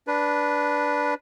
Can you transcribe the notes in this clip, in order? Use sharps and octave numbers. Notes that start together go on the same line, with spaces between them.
D4 B4